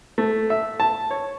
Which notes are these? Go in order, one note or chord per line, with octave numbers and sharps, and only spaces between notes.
A3
E5
A5
C#5